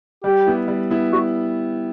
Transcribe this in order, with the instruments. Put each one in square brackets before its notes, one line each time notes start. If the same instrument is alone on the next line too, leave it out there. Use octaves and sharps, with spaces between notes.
[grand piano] G3 [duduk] G4
[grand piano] B3 E4
G3
B3 E4
[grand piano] G3 [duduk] F#4